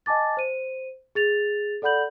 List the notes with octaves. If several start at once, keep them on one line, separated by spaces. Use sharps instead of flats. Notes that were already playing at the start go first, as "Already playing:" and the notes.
D#5 G#5 A5 D6 A6
C5 D#7
G#4 A6 F7
A4 D5 F#5 B5 G6 F#7